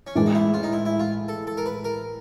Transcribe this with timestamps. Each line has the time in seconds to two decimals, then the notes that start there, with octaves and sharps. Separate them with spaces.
0.07 C#4
0.15 A2 E3 G#3 D4
0.26 D#4
0.34 E4
0.54 F4
0.63 D#4
0.72 E4
0.85 E4
1.00 F4
1.28 A4
1.47 A4
1.57 A#4
1.66 B4
1.84 A#4